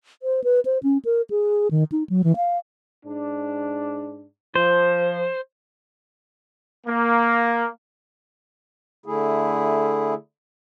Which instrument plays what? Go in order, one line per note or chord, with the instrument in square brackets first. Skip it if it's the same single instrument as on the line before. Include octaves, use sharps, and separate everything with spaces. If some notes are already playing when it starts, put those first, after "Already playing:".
[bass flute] C5
B4
C5
C#4
A#4
G#4
D#3
D#4
F#3
E3
F5
[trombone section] G#2 D4
[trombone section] F3 [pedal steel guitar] C5
[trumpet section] A#3
[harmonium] D3 A3 E4 G#4